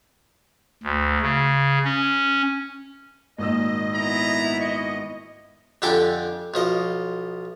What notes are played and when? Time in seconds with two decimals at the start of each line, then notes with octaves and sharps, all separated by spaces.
0.83 D2
1.22 C#3
1.84 C#4
3.38 G#1 A#2 D#5 E6
3.94 B3 E4 A#5
4.60 D#5 C#6
5.82 F2 D3 G4 A4 G5 G#5
6.54 B1 F3 D#5